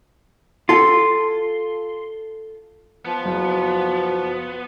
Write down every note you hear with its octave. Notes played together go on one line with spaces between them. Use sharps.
F4 A4 C6
F3 B3 A5
F#1 F#4